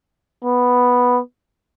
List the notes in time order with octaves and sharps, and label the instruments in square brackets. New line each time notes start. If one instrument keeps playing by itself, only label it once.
[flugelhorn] B3